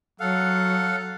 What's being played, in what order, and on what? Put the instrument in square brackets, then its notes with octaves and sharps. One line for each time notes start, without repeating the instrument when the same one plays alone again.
[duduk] F#3 [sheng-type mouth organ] A4 F5 F#5